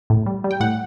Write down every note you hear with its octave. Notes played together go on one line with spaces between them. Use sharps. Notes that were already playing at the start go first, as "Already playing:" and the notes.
A2
G3
G3
G5
A2 F#5